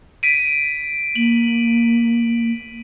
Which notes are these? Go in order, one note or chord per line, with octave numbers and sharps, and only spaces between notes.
B6 D7 D#7
A#3 F#7